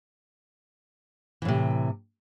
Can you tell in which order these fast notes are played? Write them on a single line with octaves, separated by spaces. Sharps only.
E3 A2 C3